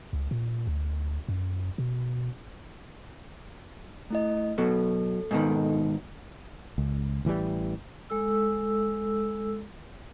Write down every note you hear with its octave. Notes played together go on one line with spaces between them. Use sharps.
C#2
A#2
D2
F#2
B2
A3 E4 D#5
B2 F#3 A4
G#2 B2 D#3
C#2
A1 E3 F#3 G3
G#3 A4 E6